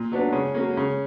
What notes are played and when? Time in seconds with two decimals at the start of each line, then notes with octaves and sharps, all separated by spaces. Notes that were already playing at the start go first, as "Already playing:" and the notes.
Already playing: A#2
0.12 F#3 B3 D4
0.32 C#3
0.55 F#3 A#3 C#4
0.77 C#3